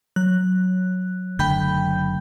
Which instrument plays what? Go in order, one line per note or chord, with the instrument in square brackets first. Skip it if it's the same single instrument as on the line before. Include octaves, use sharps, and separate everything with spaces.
[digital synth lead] F#3 [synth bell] F#6
[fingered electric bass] F#1 D3 A3 [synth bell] G5 B5 G6